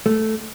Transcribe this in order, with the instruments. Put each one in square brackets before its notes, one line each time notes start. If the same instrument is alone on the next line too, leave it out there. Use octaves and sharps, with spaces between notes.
[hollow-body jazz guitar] A3